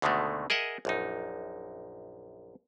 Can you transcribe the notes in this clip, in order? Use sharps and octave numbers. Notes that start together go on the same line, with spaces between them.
D2 B2 D3 D#3 G#3 A3
G#4 A#4 D#5 E5 F#5
A#1 F#2 D#4